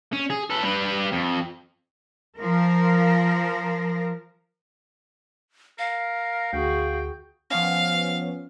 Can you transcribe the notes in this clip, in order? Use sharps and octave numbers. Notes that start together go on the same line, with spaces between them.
C#4
G#4
A4 B4
G3 B4
F2
F3 A#4
A#4 F5
D2 F#4 G#4 G5
F3 B3 C#4 F5